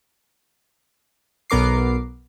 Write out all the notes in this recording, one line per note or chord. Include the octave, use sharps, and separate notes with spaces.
B1 B3 A#4 D6 C7